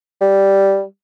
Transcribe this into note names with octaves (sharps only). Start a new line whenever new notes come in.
G3